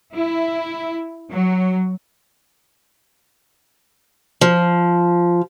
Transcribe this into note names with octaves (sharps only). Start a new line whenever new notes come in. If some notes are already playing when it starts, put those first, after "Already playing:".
E4
F#3
F3